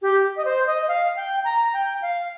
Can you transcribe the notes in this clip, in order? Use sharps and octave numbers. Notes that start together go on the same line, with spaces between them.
G4
D#5
C5
D#5
F5
G5
A#5
G5
F5